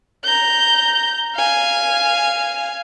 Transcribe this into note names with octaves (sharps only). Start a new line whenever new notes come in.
A#5 G6
F5 G#5